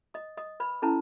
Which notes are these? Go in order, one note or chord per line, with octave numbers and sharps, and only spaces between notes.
D#5 D#6
D#5 D#6
B4 B5
C#4 E4 A4 B4 A5